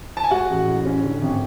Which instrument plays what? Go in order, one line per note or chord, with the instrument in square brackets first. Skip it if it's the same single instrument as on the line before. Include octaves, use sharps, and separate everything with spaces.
[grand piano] A5
G#5
G#3 F#4 F#5
A1
A2
C#4
D3
G#1